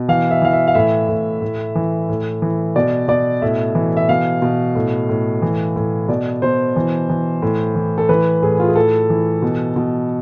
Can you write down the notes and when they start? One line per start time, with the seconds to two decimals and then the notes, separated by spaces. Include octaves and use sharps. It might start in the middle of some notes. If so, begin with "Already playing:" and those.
Already playing: B2
0.08 E3 F5
0.31 E5
0.42 E3 F5
0.53 E5
0.68 F5
0.75 A2 E5
1.09 A2
1.42 A2
1.75 E3
2.09 A2
2.42 E3
2.76 B2 D5
3.08 B2 D5
3.42 A2 E5
3.75 E3
3.97 E5
4.09 B2 F5
4.42 B2
4.75 A2
5.09 A2
5.42 E3
5.76 A2
6.08 B2 D5
6.42 B2 C5
6.76 E3
7.09 E3
7.42 A2
7.75 E3
7.98 A4
8.09 E3 B4
8.42 A2 G#4
8.60 F4
8.68 G#4
8.75 A2 A4
9.10 E3
9.42 B2
9.76 B2